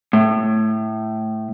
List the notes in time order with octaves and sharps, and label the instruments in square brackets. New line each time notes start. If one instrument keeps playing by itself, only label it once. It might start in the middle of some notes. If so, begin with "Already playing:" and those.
[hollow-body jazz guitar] A2